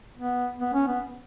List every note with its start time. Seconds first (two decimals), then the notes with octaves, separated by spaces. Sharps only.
0.16 B3
0.60 B3
0.74 C#4
0.87 B3